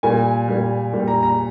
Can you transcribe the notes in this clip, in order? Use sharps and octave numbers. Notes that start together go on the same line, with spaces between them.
A#2 G3 G#5
A#2 G3
A#2 G3
A#5
A#5